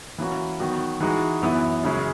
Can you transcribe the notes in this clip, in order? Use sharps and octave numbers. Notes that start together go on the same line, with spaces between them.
E3 A#3 C#4 F#4
D#3 F#3 B3 F#4
E3 G#3 D#4 F#4
F#2 E3 B3 E4
F#2 C#3 G#3 C#4